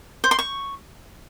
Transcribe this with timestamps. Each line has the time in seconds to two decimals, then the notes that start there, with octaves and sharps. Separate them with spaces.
0.24 C5
0.31 C6
0.39 C#6